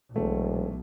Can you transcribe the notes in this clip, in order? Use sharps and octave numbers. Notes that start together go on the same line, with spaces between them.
E1 B1 A3